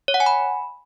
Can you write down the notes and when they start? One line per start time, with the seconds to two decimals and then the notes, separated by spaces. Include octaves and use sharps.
0.08 C#5
0.14 F#5
0.20 G#5
0.26 B5